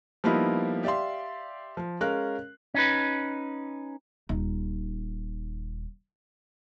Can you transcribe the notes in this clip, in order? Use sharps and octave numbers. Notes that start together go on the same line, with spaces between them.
F3 G3 A#3 B3 D#4 E4
G4 D5 E5 F5 C6
F3
G#3 C#4 A#4 F5 F#6
C#4 D#4 B4
D#1 D#4